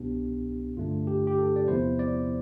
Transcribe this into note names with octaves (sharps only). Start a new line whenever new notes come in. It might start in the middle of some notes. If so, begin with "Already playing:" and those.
Already playing: C2 B2 B3 D4 G4
G2 D3 A3 D4 F4
G4
G4
A4
D5
E2 C3 F3 B3 E4 C5
D5